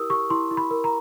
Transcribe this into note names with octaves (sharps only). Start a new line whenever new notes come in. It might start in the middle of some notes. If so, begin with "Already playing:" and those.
Already playing: E4 G4 A#4 D#6 E6
G4 C#6
E4 C6
E4
B5
A#4
A#5